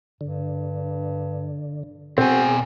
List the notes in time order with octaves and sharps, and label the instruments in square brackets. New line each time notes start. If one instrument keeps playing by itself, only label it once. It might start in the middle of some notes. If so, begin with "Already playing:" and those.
[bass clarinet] G2 [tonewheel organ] D3
[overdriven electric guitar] B2 G#5 [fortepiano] C4 [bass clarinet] F#4 [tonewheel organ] G#4